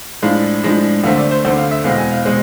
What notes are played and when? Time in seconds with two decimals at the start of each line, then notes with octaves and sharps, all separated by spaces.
0.22 A2 F3 G#3 D4 F5
0.64 A2 F3 G#3 D4
1.04 D2 D3 A3 C4 F5
1.18 D5
1.31 C5
1.45 D2 D3 A3 C4 C5
1.58 F5
1.71 E5
1.84 E2 B2 G#3 C4 F5
1.98 G#5
2.12 F5
2.25 B2 G#3 C4